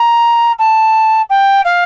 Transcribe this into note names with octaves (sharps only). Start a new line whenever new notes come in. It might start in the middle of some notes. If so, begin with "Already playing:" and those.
Already playing: A#5
A5
G5
F5